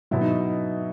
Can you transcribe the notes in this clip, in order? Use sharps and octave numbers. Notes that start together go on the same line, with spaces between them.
B2 F#3 E4
D#4